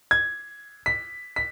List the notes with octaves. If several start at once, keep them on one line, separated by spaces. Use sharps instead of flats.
G#6
B6
B6